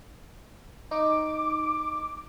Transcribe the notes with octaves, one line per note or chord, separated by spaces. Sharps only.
D#4 D6